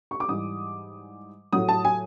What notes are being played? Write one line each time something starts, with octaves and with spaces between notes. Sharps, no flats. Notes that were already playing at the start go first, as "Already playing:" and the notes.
C#6
D6
G#2 E3 G3 D#6
A2 F#3 D#6
A5
G#5